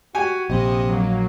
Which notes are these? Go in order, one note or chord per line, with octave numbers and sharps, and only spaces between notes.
F#4 G4 G#5
A#1 C3 D#5
F#3 A#3